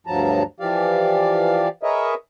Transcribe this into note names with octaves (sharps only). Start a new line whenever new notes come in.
D2 G2 F3 F#3 A5 A#5
E3 F3 G4 D5 F5
G#4 A#4 B4 C#5 D#5 E5